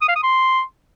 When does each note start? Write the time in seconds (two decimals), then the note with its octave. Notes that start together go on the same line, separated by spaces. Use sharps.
0.02 D#6
0.09 F5
0.16 D#6
0.23 C6